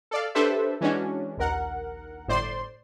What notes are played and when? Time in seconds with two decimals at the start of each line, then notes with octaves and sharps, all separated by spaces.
0.11 A4 D5 F5
0.35 D4 G4 A4 B4 C5 E5
0.81 E3 G#3 C#4 D4 F#4
1.37 A#1 D#2 A#4 F#5
2.27 G1 A2 C5 D5 C6